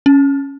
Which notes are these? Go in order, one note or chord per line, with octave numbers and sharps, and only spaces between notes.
C#4